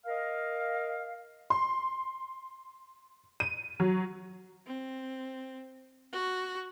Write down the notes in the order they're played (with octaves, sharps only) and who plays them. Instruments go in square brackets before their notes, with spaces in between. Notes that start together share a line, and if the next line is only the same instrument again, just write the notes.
[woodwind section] A#4 D#5 F5
[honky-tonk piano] C6
D#7
F#3
[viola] C4
F#4